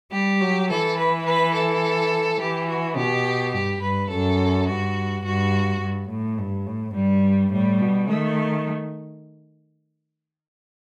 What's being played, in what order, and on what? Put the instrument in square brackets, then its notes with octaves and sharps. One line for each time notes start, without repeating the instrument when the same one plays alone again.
[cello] G3 [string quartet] G4
[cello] F#3
[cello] E3 [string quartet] A4
[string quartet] B4
B4
A4
[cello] E3 [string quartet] G4
[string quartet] F#4
[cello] B2 [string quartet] G4
[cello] G2 [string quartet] G4
[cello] G2 [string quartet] B4
[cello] F#2 [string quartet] A4
[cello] G2 [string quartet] F#4
[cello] G2 [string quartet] F#4
[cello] G2
A2
G2
A2
[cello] G2 [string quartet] G3
[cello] A2 [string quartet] G3
[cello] B2
[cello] D#3 [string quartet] A3